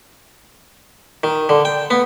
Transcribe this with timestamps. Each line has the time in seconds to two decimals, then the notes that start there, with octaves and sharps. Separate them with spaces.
1.24 D#3
1.49 D3
1.65 G5
1.91 B3